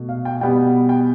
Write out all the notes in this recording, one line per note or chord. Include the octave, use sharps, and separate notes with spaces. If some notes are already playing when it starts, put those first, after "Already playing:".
Already playing: B2 A3
F5
G5
B2 G3 B3 G5
G5